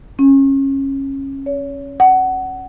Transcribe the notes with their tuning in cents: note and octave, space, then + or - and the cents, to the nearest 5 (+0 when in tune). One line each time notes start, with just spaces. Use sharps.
C#4 -25
C#5 +30
F#5 +20